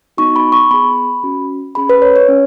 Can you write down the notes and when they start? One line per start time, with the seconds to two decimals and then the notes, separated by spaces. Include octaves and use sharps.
0.17 B3 D#4 F#4 C#6
0.36 B5
0.52 C#6
0.71 B3 G#4 B5
1.23 C#4 F#4
1.75 C#4 G#4 B5
1.89 B4
2.02 C#5
2.16 C#5
2.28 C#4